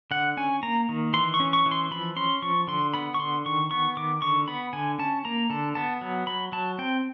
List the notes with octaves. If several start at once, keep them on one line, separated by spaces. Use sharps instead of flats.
D3 F#5
C#4 G#5
A#3 A#5
D#3
E3 C6
C#6
C#4
C#6
E3
C6
F3 B5
C#4 C6
F3 C#6
D3 C6
B3 B5
C#6
D3 C6
D#3 C#6
B3 C#6
D#3 D6
D3 C#6
B3 B5
D3 G#5
C#4 A5
A#3 A#5
D3 A5
B3 A5
F#3
F#3 B5
F#3 A5
C4 G5